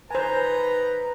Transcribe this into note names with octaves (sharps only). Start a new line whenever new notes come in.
D#3 B4 C5 G#5 A#5